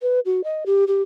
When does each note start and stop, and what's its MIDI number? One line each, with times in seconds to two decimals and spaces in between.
0.02 0.20 71
0.25 0.44 66
0.44 0.64 75
0.66 0.84 67
0.88 1.02 67